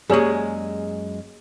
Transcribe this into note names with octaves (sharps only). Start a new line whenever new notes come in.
F#2 G#3 A#3 G4 G#4 C#5 D5